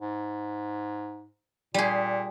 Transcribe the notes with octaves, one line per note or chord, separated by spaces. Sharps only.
G#2
A#2 G3 G#4